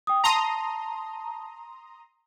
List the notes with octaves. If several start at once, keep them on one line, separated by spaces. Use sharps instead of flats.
G5 D#6
A5 A#5 C6 D#6